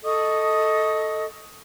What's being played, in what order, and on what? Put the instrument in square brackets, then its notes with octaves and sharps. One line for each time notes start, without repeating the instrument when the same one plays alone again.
[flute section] A4 D#5 C#6 D#6